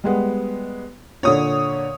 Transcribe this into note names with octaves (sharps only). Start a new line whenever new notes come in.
G3 G#3 B3
A#2 D3 C#5 D#6